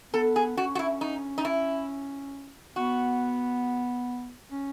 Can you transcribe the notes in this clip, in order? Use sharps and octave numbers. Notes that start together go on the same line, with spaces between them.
B3 A4
G#4
C#4 F#4
F#4
E4
D#4
D#4
E4
B3 F#4
C#4